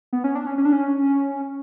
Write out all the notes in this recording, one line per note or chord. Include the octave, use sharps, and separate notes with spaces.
B3
C#4
D4
C#4
C#4
D4
C#4